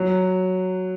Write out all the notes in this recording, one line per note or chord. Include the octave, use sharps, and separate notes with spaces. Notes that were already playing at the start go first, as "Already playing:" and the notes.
Already playing: F#3